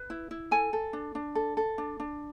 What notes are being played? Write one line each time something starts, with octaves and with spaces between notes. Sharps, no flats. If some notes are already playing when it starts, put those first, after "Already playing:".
Already playing: B4
E4
E4
A4 G#5
A4
D4
D4
A4
A4
D4
D4